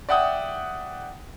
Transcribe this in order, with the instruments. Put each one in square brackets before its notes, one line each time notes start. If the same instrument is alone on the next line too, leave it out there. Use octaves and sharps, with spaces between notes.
[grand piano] D5 E5 F#5 G5 D#6